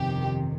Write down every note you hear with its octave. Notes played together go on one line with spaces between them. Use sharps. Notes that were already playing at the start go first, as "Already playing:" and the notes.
Already playing: G1 F2 C3 D#3 G4